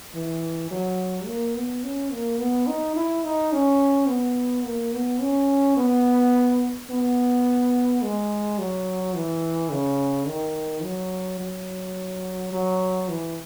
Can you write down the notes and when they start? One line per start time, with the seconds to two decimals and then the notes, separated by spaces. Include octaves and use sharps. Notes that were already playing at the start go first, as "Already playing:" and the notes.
0.14 E3
0.71 F#3
1.27 A#3
1.55 B3
1.83 C#4
2.12 A#3
2.40 B3
2.67 D#4
2.96 E4
3.24 D#4
3.53 C#4
4.08 B3
4.65 A#3
4.93 B3
5.21 C#4
5.77 B3
6.90 B3
8.02 G#3
8.59 F#3
9.14 E3
9.71 C#3
10.27 D#3
10.84 F#3
11.40 F#3
12.52 F#3
13.09 E3